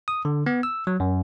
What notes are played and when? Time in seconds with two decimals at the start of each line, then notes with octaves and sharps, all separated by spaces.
0.08 D#6
0.25 D3
0.46 B3
0.63 E6
0.87 F#3
1.00 F#2